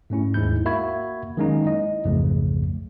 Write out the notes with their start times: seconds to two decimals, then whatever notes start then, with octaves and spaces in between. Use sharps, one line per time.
0.10 G#2 A3 C#4 E4
0.34 D#2 G#2 E4 G6
0.65 A#3 F#4 E5 B5 C#6 G#6
1.37 D#3 F#3 G#3 A#3 C#4 D#4
1.66 E4 D#5
2.05 B1 F2 G#2 C#3 F3 A3